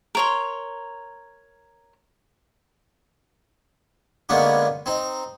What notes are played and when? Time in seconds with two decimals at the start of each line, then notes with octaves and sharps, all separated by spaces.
0.15 A#4 C#5 C6
4.29 D3 G#3 A#3 B3 C#4 D4
4.86 C4 D#4